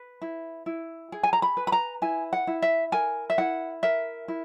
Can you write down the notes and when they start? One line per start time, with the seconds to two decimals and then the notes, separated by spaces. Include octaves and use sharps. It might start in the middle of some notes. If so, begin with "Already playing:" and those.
Already playing: B4
0.22 E4
0.66 E4
1.12 G#4
1.23 G#5
1.33 A#5
1.42 B5
1.57 B4
1.67 B5
1.72 A#5
2.02 E4 G#5
2.33 F#5
2.47 E4
2.62 E5
2.92 A#4 G#5
3.30 E5
3.38 E4 F#5
3.83 A#4 E5
4.28 E4